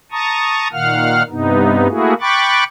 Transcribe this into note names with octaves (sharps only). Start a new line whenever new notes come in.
A5 A#5 C#6 D#6
A#2 D#3 F5 F#5 F6
G2 C3 B3 D#4
A3 A#3 E4 F#4 G#4
G5 B5 C#6 D6 F#6 A6